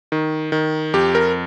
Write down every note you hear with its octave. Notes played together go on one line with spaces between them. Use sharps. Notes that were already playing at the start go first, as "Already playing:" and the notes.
D#3
D#3
F2 G4
A#4